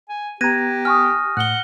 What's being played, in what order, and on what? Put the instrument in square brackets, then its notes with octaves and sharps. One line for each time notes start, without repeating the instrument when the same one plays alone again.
[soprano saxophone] G#5
[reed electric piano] B3 A#5 [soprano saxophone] G4 [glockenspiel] F#6 A#6 D#7 [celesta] G#6
[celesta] G#5 C#6 D#6 [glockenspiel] F6
[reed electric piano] A2 [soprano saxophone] F#5 [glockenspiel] F#6 G7